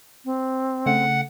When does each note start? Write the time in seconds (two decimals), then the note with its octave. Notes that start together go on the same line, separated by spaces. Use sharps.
0.25 C4
0.86 C#3 A3 F#5